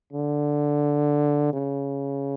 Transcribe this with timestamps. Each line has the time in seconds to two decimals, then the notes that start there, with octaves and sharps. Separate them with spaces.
0.13 D3
1.53 C#3